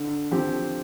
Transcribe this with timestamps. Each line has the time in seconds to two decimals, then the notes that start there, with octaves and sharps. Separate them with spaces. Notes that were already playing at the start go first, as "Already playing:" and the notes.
Already playing: D3
0.31 F3 C4 G4